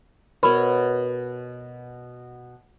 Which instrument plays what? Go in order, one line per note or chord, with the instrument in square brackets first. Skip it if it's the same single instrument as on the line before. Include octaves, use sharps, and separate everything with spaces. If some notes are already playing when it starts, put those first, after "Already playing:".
[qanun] B2 C#5 [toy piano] A#4 B4 B5